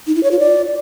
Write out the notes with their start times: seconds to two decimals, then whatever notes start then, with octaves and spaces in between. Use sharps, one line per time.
0.07 D#4
0.15 E4
0.23 C#5
0.31 F4
0.39 D5